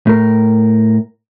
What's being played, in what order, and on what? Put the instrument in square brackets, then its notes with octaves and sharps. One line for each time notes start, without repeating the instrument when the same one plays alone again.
[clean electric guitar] A2 A#4